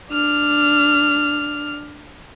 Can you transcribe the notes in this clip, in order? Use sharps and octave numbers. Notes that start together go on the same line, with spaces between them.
D4 F6